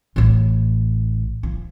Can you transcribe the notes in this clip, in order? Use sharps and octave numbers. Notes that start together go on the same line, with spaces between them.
A1 A2
F3